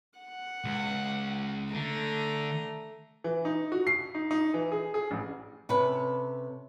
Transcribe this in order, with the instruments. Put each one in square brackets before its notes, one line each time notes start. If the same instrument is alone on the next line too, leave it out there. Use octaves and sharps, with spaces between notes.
[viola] F#5
[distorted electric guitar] C#2
[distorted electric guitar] D3 [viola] A3 A#5
[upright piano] E3
D#4
F#4
C7
D#4
D#4
E3
G#4
G#4
A1
[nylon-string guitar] C3 C#4 A4 B4